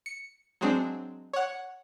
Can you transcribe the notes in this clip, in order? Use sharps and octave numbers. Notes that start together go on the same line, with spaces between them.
C#7
F#3 G#3 C4 D4
C#5 F#5